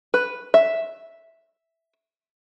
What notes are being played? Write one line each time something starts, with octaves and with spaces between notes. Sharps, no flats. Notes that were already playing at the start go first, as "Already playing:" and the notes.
B4
E5